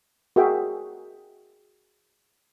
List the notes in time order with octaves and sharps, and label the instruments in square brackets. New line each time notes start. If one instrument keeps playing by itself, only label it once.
[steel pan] F#4 G#4 A#4 E5 G5